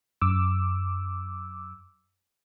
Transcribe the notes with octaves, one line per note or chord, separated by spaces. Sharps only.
F#2 D6 E6